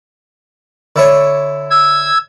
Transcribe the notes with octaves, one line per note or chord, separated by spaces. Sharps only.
D3 E4 C#5
E6 G#6